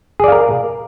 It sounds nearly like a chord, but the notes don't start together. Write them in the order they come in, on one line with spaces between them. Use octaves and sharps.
G#4 D5 F5 A#4